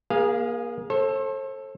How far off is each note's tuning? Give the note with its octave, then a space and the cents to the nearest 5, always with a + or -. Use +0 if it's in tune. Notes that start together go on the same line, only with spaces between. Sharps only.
A#3 +30 G#4 -15 F5 -5
A4 +0 C5 +40